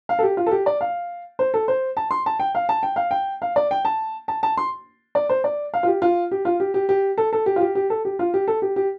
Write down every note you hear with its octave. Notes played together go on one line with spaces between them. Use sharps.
F5
A4
G4
F4
A4
G4
D5
F5
C5
A4
C5
A5
C6
A5
G5
F5
A5
G5
F5
G5
F5
D5
G5
A5
A5
A5
C6
D5
C5
D5
F5
F4
G4
F4
G4
F4
G4
G4
G4
A4
A4
G4
F4
G4
G4
A4
G4
F4
G4
A4
G4
G4